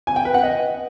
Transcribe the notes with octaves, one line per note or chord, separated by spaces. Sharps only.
G#5
G5
B4
F#5
D#5